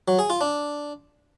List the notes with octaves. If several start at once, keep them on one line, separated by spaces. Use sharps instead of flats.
F#3
G#4
F4
D4